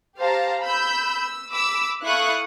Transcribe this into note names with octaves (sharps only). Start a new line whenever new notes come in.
G4 C5 F5 A5 A#5
B5 E6 G6
E6
B5 D6 E6
E4 A4 F5 C#6 D#6 F#6